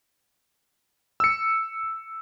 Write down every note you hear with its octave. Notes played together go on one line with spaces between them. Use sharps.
E6 C#7